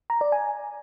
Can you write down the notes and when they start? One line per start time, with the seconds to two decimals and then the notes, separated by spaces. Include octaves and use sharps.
0.10 A#5
0.21 D5
0.32 G#5